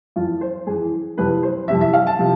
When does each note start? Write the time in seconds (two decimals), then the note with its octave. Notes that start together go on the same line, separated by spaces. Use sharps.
0.16 F2 E3 F4
0.41 C5
0.67 F2 E3 G#4
1.17 F2 C3 E3 B4
1.43 C5
1.68 F2 C3 E3 E5
1.81 E5
1.93 F5
2.07 A5
2.19 C3 F3